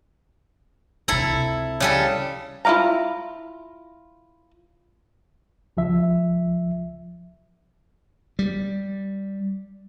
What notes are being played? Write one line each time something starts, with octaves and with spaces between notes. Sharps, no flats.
C#2 C3 E4 A4 A#5
C#3 G3 A4
E4 F4 D5 F5 A#5
C#2 F3 E5
G3